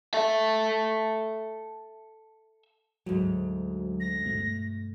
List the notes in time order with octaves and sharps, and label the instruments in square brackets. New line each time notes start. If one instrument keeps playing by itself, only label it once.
[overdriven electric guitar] A4 E5
[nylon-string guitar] D2 G#2 [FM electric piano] F#3
[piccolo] A#6
[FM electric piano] G2 B2 A3